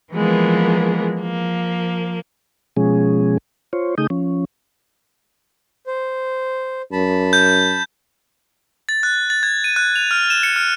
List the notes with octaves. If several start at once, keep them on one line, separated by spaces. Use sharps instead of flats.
E3 F3 G#3 A#3 B3
F3 A#3
B2 F3 G#3 C#4 G#4
F4 C5 C#5
C#3 A3 D#4 G#4 D#6 G6
F3 C#4
C5
F#2 A5 B5
G6
A6
F#6
A6
G#6
D#7
F#6
F7
F6
E7
C#7
F6